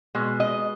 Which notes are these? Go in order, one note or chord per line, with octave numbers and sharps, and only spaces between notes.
B2 G#3
D#5